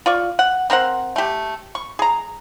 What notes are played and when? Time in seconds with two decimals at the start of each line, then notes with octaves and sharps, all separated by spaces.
0.06 F4 D5 C#6
0.39 F#5
0.70 C4 A#4 C5 F#5
1.16 A3 G4
1.75 C#6
1.99 G#4 A#5